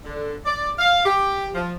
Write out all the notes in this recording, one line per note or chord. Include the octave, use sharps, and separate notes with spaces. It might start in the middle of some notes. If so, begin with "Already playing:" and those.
D3
D5
F5
G4
F3